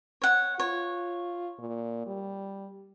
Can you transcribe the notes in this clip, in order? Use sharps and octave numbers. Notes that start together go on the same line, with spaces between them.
C#5 F#5
F4 C#5
A#2
G3